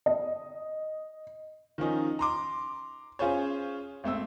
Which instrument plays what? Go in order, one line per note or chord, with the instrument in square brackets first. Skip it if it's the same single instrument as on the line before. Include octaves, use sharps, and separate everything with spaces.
[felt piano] D#5
[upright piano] D#3 F3 C#4 D#4
A#5 C6 D6
C#4 F4 G#4 C5 C#5
G#1 A3 C4 E6